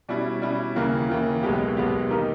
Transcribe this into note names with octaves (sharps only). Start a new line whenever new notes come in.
B2 G3 C#4 E4
B2 G3 C#4 E4
D#2 C#3 E3 A#3
D#2 C#3 E3 A#3
B1 B2 G#3 B3 G4
B1 B2 G#3 B3 G4
D#3 A#3 D#4 G4